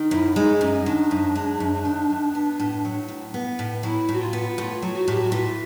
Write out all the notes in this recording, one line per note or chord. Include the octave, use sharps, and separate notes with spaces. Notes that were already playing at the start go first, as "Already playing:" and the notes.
Already playing: D#3
F#2 E4
G#3 D#4
F#2 C#4
D#3 D4
F#2
G#3
F#2
D#3
F#2
B3
A2
F#3
A2
B3
A2
F#3 E4
A2 F#4
F4
B3
A2 F4
F#3
F#4
A2 G4
F#4
E3 F4